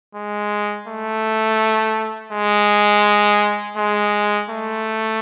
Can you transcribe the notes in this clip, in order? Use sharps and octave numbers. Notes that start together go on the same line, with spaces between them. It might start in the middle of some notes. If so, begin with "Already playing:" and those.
G#3
A3
G#3
G#3
A3